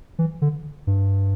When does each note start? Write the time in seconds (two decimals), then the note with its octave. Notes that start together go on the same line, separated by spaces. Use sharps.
0.19 E3
0.42 D3
0.87 G2